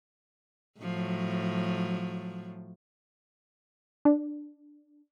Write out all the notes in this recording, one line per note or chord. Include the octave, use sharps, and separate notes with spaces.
A2 F3 F#3
D4